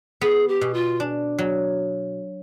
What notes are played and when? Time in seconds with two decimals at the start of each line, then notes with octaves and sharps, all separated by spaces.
0.21 B3 G#4
0.48 G4
0.61 B2
0.74 F4
1.00 D4
1.39 F#3